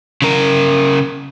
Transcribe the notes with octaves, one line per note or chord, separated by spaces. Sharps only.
C#3 A#4